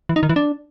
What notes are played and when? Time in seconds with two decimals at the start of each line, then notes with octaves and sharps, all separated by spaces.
0.09 E3
0.16 D#4
0.23 D#3
0.29 E3
0.36 D4